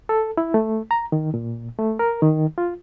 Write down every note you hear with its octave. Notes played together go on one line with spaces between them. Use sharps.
A4
E4
A3
A#5
D#3
A#2
A3
A#4
D#3
F4